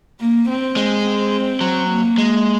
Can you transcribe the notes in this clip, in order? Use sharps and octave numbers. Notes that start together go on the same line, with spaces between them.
A#3
C4
G#3
C4
F#3
A#3
G#3